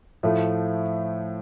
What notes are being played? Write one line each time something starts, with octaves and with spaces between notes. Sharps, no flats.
A2 F3 A3